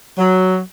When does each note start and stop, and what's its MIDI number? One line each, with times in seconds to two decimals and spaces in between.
0.17 0.58 54